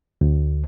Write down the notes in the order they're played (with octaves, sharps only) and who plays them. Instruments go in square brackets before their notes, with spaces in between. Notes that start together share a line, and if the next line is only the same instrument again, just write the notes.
[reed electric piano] D2